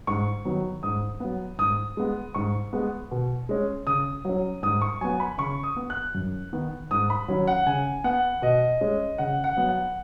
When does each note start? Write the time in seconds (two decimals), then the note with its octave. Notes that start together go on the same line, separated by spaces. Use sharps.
0.07 G#2 C#6
0.45 D#3 F#3 B3
0.83 G#2 D#6
1.20 F#3 B3
1.58 G#2 D#6
1.97 G#3 B3
2.34 G#2 C#6
2.73 G#3 B3
3.11 B2
3.49 G#3 C#4
3.87 C#3 D#6
4.25 F#3 C#4
4.63 G#2 D#6
4.81 C#6
5.01 F#3 B3 G#5
5.20 B5
5.38 C#3 C#6
5.63 D#6
5.76 B3
5.90 F#6
6.14 F#2
6.53 D#3 B3
6.91 G#2 D#6
7.10 B5
7.28 D#3 F#3 C#4
7.47 F#5
7.66 C#3 G#5
8.04 B3 F#5
8.42 B2 D#5
8.81 G#3 C#4
9.18 C#3 F#5
9.44 F#5
9.57 F#3 B3
9.69 F#5